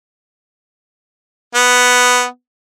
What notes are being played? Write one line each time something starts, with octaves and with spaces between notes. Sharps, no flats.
B3